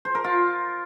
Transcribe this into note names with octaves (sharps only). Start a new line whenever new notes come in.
C5
A#4
F4